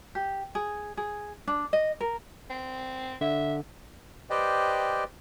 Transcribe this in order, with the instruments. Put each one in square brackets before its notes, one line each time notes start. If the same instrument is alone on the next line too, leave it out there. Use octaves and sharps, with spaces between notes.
[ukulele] G4
G#4
G#4
D4
D#5
A#4
[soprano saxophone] C4
[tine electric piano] D3 [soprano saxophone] E5
[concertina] G4 B4 C5 D5 D#5 G5